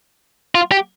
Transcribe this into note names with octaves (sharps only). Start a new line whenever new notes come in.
F4
G4